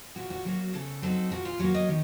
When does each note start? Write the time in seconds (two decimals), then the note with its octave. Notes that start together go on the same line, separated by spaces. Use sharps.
0.16 A#2 F#4
0.30 F#4
0.45 F#3 A#3 F#4
0.73 C#3 A4
1.02 F#3 C4 D#4 A4
1.31 A#2 F#4
1.45 F4
1.59 F#3 A#3 F#4
1.74 D#5
1.89 D#3